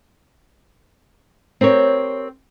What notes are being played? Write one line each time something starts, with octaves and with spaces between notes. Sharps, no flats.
C4 G4 A#4 C#5